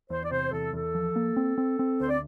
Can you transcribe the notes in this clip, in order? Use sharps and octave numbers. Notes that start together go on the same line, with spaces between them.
E2 C5
D5
C3 C5
E2 A4
E2 A4
F3
A#3
C4
C4
C4
D2 C5
D5